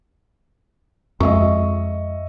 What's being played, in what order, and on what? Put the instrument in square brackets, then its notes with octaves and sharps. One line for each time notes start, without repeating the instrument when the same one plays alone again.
[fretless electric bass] F2 G#3 [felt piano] D#5 E5 C#6